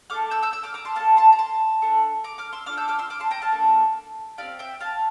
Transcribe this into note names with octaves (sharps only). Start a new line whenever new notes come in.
A3 D4 A4 D6 F6
E6 G6
E6 G6
E6 G6
D6 F6
A#5 D6
A5 C6
A#3 D4 F4 A4 F5 A5
A5 C6
A#5
A5 C6
D4 A4
A#5 D6
D6 F6
C6 E6
D4 F4 A4 D6 F6
E6 G6
D6 F6
C6 E6
D6 F6
A5 C6
G5 A#5
F5 A5
A#3 D4 A4
C4 E4 G4 D5 F5
E5 G5
F5 A5